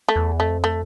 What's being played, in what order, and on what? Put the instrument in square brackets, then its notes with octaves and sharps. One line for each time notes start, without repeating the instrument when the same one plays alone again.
[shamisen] A3
[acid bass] E2
[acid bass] F2 [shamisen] A3
[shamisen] A3